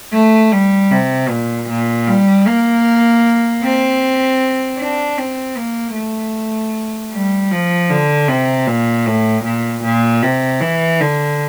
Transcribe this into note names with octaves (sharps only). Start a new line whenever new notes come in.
A3
G3
C3
A#2
A#2
G3
A#3
C4
D4
C4
A#3
A3
G3
F3
D3
C3
A#2
A2
A#2
A#2
C3
E3
D3